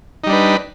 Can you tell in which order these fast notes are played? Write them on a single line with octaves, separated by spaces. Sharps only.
D#4 G3 D4 B4